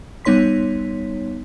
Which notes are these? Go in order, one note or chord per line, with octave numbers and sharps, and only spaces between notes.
G3 B3 D#4 C#5 C6 B6